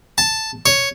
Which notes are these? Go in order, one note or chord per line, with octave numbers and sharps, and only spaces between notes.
A5
C#5